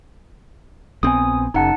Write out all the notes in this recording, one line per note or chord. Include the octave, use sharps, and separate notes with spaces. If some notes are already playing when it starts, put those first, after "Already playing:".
A#1 B3 C4 G#5 D#6
F#1 C#3 D#4 F#5 A5